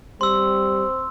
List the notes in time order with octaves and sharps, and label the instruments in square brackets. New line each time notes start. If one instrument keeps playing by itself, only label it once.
[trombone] G3 [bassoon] C4 [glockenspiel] C6 E6